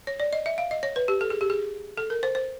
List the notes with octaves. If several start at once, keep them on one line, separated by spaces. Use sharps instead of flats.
C#5
D5
D#5
E5
F5
D#5
C#5
B4
G4
A4
G#4
G4
G#4
A4
A#4
C5
C5